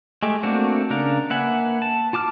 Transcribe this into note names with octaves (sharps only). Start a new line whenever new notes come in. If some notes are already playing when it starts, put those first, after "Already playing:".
G#3 A3 G4
A3 A#3 C4 D4 F#4
C#3 D4 A#4 F5
A#3 B4 E5 F#5 G#5
A5
F4 A5 D6 F6